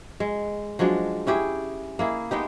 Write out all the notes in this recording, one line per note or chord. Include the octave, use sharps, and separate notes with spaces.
G#3
F3 F#3 G#3 D4
C#4 E4 G4 G#4
A#3 E4 G#4
G#3 B3 D#4 G4